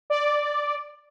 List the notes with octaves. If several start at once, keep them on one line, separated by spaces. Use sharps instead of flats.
D5